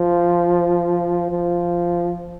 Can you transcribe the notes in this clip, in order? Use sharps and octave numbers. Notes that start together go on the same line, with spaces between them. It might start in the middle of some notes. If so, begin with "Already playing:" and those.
Already playing: F3
F3